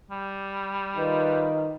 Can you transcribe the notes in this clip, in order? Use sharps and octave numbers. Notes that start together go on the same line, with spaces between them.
G3
D#3 F4 B4